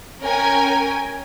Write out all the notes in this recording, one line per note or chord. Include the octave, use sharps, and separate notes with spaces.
C#4 A#4 G5 G#5